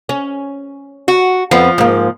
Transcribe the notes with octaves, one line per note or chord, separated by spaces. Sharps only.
C#4
F#4
F2 F3 B3
G#2 A#3